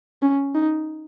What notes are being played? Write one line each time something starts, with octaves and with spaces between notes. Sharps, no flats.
C#4
D#4